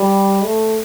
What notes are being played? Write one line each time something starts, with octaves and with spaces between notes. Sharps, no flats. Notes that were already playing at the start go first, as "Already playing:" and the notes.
Already playing: G3
A3